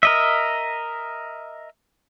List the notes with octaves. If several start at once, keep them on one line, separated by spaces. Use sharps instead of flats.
A#4 D#5 E5